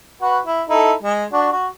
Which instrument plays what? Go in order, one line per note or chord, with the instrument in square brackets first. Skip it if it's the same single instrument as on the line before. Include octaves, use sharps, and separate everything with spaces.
[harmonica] F#4 B4 F#5
E4
D#4 E4 A4
G#3
D4 F#4
F#4